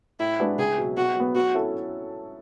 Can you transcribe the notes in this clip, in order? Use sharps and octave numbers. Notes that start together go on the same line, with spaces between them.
A2 E4
G#3 D4 F#4 B4
C#2 G#4
B2 F#3
B2 F#4
F#3 B3
F#3 F#4
C#4 E4 A4 E5